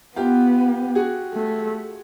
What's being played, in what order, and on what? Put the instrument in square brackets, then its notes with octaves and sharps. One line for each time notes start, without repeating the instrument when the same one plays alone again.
[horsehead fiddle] B3 [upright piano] F4 G4
[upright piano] F#4 G#4
[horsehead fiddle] A3